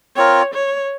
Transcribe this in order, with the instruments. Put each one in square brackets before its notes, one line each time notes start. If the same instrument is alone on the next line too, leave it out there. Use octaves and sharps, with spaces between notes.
[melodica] C4 F4 A#4 [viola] C#5
[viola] C#5